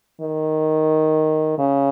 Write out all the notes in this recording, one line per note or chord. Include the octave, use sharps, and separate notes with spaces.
D#3
C#3